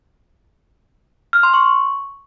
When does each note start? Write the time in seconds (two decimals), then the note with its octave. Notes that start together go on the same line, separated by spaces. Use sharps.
1.33 F6
1.43 C6
1.54 C#6